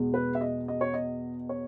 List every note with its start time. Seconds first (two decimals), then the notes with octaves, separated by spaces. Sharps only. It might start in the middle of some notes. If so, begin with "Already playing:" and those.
Already playing: E2 B2 G#3 B3
0.14 B4
0.35 E5
0.41 D#5
0.68 D#5
0.81 C#5
0.94 D#5
1.49 C#5